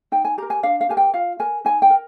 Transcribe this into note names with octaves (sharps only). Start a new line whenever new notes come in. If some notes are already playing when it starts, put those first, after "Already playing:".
D#4 G5
G#5
G4 A#4 A#5
G#5
D4 F5
F5
G4 A#4 G#5
G5
F4 F5
A#4 G#5
D#4 G#5
G5
A#4